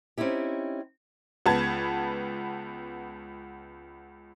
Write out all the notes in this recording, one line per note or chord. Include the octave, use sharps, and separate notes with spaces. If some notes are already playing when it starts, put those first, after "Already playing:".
C4 C#4 D#4 E4 G4
C#2 B3 A5 G#6